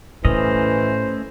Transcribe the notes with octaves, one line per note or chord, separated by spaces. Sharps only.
A2 E3 A3 C#4 C5 D#5